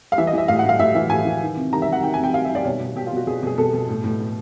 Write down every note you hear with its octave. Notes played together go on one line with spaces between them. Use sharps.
F5
E3 E5
D#5
E3 E5
A2 F5
F#5
A2 F5
A2 E5
E3 E5
A2 G#5
E3
D#3
C3
D#3 A#5
E5
C3
F#5
D#3 G5
G#5
C3 G5
C3 F5
E5
D#3
D5
B2 C#5
B2
B2 G4
F4
B2 F#4
B2 G#4
B2 G#4
B2 A4
B2
A2
A2
A2